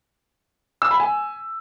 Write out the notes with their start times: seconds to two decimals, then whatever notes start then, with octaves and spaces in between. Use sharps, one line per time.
0.82 E6
0.91 B5
1.00 G#5